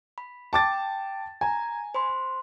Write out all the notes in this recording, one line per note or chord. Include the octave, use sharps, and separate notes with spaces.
B5
G5 A5 D6 A6
G#5 A#5 G#6
C5 B5 C6